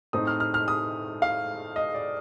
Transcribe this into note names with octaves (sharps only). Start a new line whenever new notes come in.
A2 A3 C4 D#4 D#6
F6
F6
F6
D#6
F5
D#5
D5